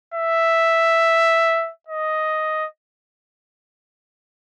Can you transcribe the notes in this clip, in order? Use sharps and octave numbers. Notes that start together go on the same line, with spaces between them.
E5
D#5